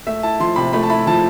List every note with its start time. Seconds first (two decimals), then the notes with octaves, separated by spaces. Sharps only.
0.07 A3 E5
0.23 E4 A5
0.40 F3 C6
0.56 C3 B5
0.73 A3 B5
0.83 A5
0.90 E4 B5
1.07 F3 A5